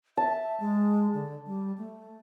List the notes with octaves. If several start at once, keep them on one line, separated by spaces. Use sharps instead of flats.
E5 A5
G#3
D3
G3
A3